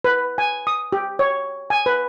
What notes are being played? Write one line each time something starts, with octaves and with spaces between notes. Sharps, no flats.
B4
G#5
D#6
G4
C#5
G#5
B4